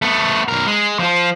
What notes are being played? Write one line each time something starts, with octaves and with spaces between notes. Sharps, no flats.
A3 B3
B1 A#4
G#3
F3 F4